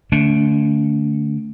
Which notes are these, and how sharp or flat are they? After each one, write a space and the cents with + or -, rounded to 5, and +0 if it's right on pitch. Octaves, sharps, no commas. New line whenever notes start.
D3 +0 A3 +0 D4 -45